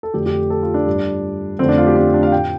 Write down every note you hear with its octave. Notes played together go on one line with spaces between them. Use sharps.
A4
F2 D3 A3 G4
G4
A4
F4
D4
G2 G3
F2 D3 A3 C4
D4
F4
G4
D4
D4
F5
A2 A3 G5